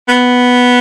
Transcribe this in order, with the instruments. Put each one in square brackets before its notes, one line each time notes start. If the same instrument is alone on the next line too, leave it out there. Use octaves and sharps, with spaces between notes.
[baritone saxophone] B3